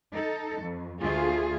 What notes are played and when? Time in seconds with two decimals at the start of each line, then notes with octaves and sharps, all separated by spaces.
0.13 D#4 A4
0.60 F2
1.01 D2 A3 F4 G#4